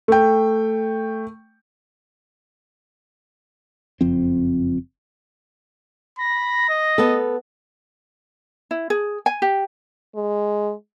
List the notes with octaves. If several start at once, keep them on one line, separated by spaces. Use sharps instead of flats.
A3 G5
F#1 F2 F3 C4
B5 A#6
D#5
B3 A4
E4
G#4
G#5
G4
G#3